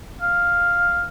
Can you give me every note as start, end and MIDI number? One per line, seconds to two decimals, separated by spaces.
0.22 1.06 77